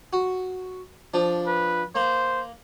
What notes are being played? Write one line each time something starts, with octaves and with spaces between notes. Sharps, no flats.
F#4
F3 D4
B4
A#3 C5